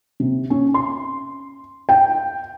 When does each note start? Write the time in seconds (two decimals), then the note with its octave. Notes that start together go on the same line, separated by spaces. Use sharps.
0.20 C3
0.50 C#4
0.74 C6
1.89 G5